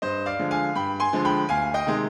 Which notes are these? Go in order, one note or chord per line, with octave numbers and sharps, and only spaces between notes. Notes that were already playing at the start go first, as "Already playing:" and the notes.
G2 C5 D#5
D5 F5
D3 F3 G#3
F5 G#5
G2 G5 B5
G#5 C6
D3 F3 G#3
G5 B5
D2 F5 G#5
D#5 G5
C3 D#3 G#3